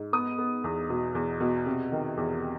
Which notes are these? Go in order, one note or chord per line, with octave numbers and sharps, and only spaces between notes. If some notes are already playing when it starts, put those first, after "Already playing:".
Already playing: G#2
B3 D#6
B3
E2
B2
E2
B2
C3
D#3
E2